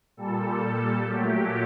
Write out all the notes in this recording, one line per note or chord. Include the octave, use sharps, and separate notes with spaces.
A#2 G3 A4
A#2 F#3 A3 G4